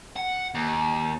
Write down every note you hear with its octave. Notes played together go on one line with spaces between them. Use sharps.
F#5
D#2